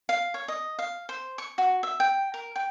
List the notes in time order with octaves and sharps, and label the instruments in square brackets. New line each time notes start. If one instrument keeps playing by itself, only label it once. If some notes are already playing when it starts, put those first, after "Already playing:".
[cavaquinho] F5
C#5
D#5
F5
C5
C#6
F#4
E5
G5
A#4
G5